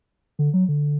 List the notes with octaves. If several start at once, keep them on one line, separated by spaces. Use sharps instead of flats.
D3
F#3
D3